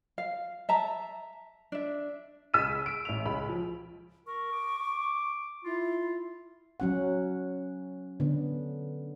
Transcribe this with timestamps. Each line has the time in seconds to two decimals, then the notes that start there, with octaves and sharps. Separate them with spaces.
0.18 F5
0.69 E5 A5 A#5
1.72 D4 E5
2.54 C#2 E6 B6 D#7
2.86 D7
3.05 A1 F7
3.25 C#2 B5
3.49 F3
4.27 A#4 C#6
4.53 D6
5.65 E4 F4
6.80 F#3 C#4 F#5
8.20 D3 B3